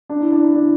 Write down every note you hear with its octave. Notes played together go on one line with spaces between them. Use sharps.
D4
E4
D4
E4
D4